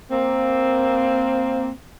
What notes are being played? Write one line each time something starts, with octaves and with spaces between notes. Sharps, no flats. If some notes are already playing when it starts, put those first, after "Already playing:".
A#3 C4